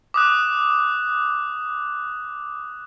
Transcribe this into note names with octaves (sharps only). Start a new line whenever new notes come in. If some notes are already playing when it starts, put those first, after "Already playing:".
D6 D#6 F#6